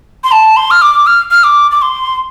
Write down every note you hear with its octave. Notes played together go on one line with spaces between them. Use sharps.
C6
A5
C6
F6
D6
F6
F6
D6
D6
C6